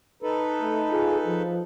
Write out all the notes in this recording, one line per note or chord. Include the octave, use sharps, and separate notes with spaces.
D#4 A4 B4
A3
F4 G#4
F3